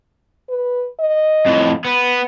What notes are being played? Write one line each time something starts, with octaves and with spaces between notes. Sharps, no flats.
B4
D#5
F2 A2
B3